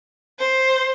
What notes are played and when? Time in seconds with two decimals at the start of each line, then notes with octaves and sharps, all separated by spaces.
0.40 C5